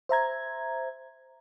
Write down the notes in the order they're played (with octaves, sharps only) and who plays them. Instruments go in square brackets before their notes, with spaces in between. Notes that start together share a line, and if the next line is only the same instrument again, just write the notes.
[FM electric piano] C5 E5 A#5 G#6